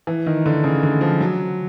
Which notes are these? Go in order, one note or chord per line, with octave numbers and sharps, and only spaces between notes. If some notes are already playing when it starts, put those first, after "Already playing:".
E3
D#3
D3
C#3
D3
F3
F#3